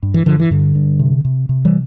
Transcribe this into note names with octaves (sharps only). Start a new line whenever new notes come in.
G2
E3
G2 D3 F3
E3
G2 D3
G2
C3
C3
C3
E3 G3